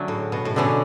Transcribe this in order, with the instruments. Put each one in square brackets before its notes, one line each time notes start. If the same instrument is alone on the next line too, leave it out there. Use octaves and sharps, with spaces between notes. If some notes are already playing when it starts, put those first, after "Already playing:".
Already playing: [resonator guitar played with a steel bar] D3 A3 C#4 [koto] F#3
[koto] A2
B2
A2
[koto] B2 [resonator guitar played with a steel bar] D3 A3 C#4